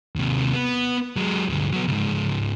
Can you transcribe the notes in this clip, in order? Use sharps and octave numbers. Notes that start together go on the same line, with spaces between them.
D#2 C3
B3
F#3 G#3
D2 G2
F#3 B3
C#2 G#2